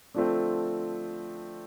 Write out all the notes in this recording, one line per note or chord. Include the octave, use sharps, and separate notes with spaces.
D3 F3 A3 C4